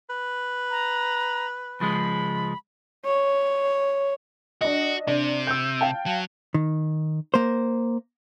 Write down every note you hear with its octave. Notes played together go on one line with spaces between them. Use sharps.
B4
A#5
C#2 F3 G#3 B5
C#5
D4 F#4 D#5
C3 D4
E6 G6
F5 G5 A5
F#3
D#3
A#3 C5